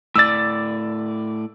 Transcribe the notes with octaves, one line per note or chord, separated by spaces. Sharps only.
A2 D5 E6 A6